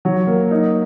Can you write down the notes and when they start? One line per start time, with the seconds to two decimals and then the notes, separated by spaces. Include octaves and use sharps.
0.05 F#3
0.27 A#3
0.51 D#4